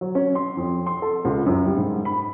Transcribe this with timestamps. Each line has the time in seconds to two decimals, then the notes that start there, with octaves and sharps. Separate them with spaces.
0.01 F#3
0.15 C#4
0.35 C6
0.57 F2
0.86 C6
1.02 A4
1.25 C#2
1.46 F#2
1.66 G3
1.77 G#2
2.05 B5